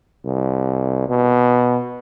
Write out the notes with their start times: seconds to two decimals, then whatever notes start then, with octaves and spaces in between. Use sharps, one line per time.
0.25 C2
1.09 B2